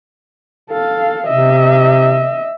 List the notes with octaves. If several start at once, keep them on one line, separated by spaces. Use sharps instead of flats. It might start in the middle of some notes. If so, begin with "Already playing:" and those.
A4 F5
C3 D#5 E5